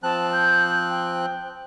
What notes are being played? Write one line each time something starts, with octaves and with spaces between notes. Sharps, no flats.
F3 C4 A5 F#6
G6
G5